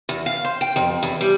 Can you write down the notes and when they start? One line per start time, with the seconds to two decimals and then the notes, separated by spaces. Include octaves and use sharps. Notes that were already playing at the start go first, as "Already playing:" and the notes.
0.09 E2
0.26 F5
0.45 C5
0.61 G5
0.76 F2
1.03 E2
1.21 G3